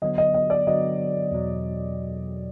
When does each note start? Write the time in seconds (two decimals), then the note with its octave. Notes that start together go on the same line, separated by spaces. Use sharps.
0.02 D3 F#3 B3 D#5
0.18 D#5
0.34 D#5
0.50 D5
0.67 D3 F#3 B3 D#5
1.32 E2 B2 F#3